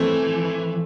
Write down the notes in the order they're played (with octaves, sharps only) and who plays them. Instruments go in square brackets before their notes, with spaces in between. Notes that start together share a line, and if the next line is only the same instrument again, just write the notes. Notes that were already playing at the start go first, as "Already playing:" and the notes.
Already playing: [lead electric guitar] E3 [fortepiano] A3 C4